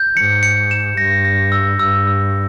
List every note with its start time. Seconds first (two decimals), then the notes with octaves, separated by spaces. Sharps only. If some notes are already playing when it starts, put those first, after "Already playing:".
Already playing: G6
0.16 G#2 C#7
0.43 C#7
0.71 E7
0.97 G2 A#6
1.25 A#6
1.52 E6
1.79 G2 E6
2.07 E6